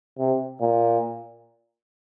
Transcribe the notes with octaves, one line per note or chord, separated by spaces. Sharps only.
C3
A#2